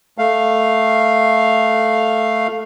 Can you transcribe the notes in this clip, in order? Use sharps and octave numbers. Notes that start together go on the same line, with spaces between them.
A3 F5